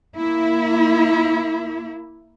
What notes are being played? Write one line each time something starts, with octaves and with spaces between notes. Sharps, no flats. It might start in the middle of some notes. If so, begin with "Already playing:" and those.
A#3 E4